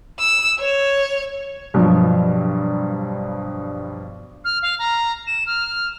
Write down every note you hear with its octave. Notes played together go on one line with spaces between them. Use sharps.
E6
C#5
G2 B2 F3 F#3
F6
F5
A#5
E7
F6